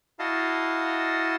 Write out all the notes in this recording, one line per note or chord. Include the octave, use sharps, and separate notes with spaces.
E4 F#4 D#5 F5 A5